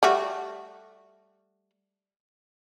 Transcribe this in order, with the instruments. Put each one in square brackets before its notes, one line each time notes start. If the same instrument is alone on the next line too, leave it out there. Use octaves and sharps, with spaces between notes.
[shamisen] G3 A3 F#4